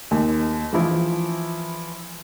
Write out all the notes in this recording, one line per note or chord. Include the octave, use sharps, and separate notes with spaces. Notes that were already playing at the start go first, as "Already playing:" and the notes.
D#2
E3 F3 E4